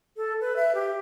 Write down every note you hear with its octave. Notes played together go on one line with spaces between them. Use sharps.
A4
B4
E5
G4